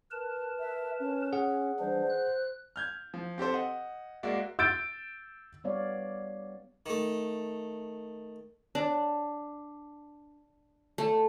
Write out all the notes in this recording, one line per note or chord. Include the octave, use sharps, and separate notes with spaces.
A#4 B4 A5
E5
C#4
G#4 F#5
E3 G3 D4 C5
F#6
F6 G6 G#6
F3
C4 G4 A4 C5
D#5 F#5
G#3 A#3 F#4 D5 E5
E6 G6 A6 D7
G3 B3 C#5 D5 F5
D#3 A3
D4
A3